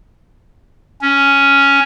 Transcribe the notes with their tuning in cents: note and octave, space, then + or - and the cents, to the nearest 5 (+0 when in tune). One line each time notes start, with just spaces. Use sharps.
C#4 +5